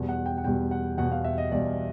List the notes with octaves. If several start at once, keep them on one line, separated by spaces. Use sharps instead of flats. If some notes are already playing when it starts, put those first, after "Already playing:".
Already playing: E2 B2 G3
F#5
G5
F#5
E2 B2 G3 G5
F#5
E2 B2 G3 F#5
F5
E5
D#5
E2 B2 G3 D5